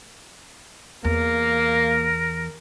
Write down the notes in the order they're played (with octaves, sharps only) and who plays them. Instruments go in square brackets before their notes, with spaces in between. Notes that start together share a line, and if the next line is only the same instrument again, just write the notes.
[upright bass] E2 [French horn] A#3 [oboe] A#4